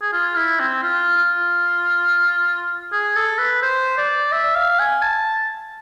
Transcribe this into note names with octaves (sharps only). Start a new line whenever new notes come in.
G#4
F4
E4
C4
F4
F4
G#4
A4
B4
C5
D5
E5
F5
G#5
A5